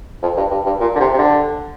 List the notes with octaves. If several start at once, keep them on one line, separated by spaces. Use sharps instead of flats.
F2
G2
G2
G2
A#2
D3
C3
C3
D3